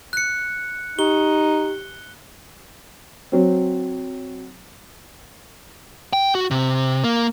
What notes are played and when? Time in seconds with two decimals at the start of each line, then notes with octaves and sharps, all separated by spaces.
0.13 F#6 C#7
0.99 D#4 G4 G7
3.32 F#3 C4
6.13 G5
6.35 F#4
6.51 C3
7.04 A#3